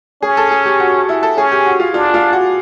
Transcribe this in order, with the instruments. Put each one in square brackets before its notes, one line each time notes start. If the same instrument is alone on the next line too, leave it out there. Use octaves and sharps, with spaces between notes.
[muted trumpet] C#4 [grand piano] G#4
[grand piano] A4
G#4
G4
F#4
E4
A4
[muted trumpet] C#4 [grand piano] G#4
[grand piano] G4
F#4
F4
[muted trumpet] D4 [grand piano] F4
[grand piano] F4
F#4